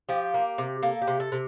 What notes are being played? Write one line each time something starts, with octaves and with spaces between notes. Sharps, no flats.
F3 G4
A#3
C3
A#3 A4
G4
C3
A4
C3